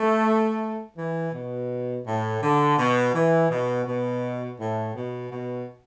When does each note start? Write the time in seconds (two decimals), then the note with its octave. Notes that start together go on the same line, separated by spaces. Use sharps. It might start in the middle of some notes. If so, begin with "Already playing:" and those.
Already playing: A3
0.96 E3
1.33 B2
2.05 A2
2.41 D3
2.77 B2
3.13 E3
3.50 B2
3.85 B2
4.59 A2
4.94 B2
5.30 B2